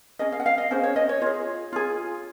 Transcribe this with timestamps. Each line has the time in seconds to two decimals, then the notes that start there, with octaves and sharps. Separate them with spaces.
0.19 C#4 G#4 D#5
0.32 F5
0.40 F#5
0.46 F5
0.58 D#5
0.71 C#4 G#4 C5
0.83 C#5
0.96 D#5
1.09 C#5
1.22 F4 G#4 C#5
1.73 F4 G#4